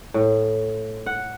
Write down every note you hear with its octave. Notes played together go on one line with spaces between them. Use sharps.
A2
F#5